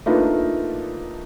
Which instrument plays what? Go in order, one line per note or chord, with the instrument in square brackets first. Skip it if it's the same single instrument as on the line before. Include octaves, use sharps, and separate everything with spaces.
[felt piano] A3 A#3 D4 D#4 F4 B4